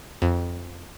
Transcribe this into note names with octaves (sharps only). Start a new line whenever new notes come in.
F2